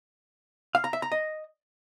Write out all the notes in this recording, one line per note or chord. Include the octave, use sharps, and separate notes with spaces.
F5
A#5
E5
A#5
D#5